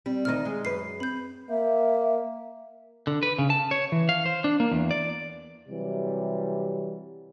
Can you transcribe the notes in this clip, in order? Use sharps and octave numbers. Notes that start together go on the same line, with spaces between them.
G3 C4
D2 D#3 D#4 F6
G#3 G#4
F#2 B4 C7
C4 B5 G6
A#3 E5
D3
B4
C#3
A5
C#5
E3
F5
C5
D4
A#3
E2
D5
C3 E3 F#3 G3